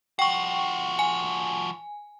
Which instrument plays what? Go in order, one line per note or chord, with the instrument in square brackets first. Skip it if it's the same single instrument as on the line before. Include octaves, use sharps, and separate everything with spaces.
[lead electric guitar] F3 F#4 [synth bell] G5 C#6
[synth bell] G#5